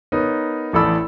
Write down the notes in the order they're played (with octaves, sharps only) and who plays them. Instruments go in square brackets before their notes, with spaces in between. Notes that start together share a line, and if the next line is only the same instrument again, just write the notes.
[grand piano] B3 D#4 A#4 C#5
A1 A3 A4 D5 B5 E6